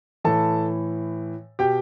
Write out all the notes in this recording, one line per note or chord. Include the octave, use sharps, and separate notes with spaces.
A2 E3 A4 A5
B2 G4 G5